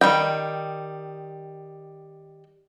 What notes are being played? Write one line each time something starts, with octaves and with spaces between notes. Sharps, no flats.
D#3 E3 G3 G5